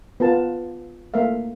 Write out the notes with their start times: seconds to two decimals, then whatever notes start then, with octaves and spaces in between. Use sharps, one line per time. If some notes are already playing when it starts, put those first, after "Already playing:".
0.20 B3 F4 A#4 A5
1.14 A3 A#3 A#4 E5 F5